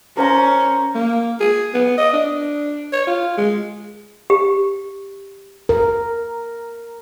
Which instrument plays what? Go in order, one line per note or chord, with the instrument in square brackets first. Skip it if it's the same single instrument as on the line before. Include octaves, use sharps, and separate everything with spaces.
[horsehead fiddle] C#4 [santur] A#4 C5 A#5
[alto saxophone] A#3
G#4
B3
D#5
D4
C#5
F4
G#3
[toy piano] G4
[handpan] A#4